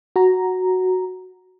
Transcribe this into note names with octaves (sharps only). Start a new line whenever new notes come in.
F#4 A#5